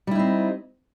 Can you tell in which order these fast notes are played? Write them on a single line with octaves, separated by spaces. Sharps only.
G3 E4 D#4 C4